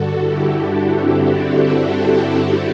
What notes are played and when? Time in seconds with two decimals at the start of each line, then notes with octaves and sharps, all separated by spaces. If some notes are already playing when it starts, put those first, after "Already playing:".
Already playing: G2 D3 F#4 A4
0.18 E4 G4
0.55 D4 F#4
0.94 C4 E4